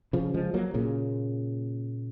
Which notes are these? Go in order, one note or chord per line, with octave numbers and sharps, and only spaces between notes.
C#3 F3
F3 G#3
F#3 A#3
A#2 C#3